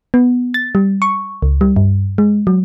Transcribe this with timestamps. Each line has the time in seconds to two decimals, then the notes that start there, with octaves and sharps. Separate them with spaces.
0.14 B3
0.54 A6
0.75 G3
1.02 C#6
1.42 C#2
1.61 G3
1.76 G2
2.18 G#3
2.47 F#3